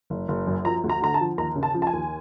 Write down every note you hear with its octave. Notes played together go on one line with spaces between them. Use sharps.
F#1
F#1
F#2
F3 A#5
D2
A#5
D3 A#5
A5
F3
D#2 A#5
C#3
A5
F3
A5
G#5
D#2